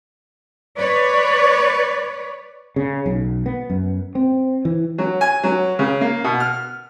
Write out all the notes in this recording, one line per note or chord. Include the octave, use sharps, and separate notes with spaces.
B4 C#5 D5
C#3
B1
B3
F#2
C4
E3
F#3
G#5
F#3
C#3
A#3
B2
F6